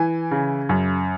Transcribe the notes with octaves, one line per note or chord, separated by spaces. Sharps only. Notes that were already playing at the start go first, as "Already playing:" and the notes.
Already playing: E3 G#5
C#3
F#2